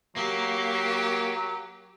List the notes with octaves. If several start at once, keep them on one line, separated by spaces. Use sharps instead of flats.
F#3 A#3 G4